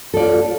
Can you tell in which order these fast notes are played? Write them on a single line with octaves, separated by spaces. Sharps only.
A4 D5 F4